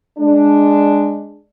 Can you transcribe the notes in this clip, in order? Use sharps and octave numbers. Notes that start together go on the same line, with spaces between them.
G#3 D4